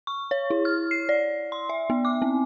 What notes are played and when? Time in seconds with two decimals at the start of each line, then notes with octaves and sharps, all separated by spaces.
0.07 C#6
0.31 C#5
0.50 E4
0.65 F6
0.91 C7
1.09 D5
1.52 C6
1.69 E5
1.90 B3
2.05 D6
2.22 C4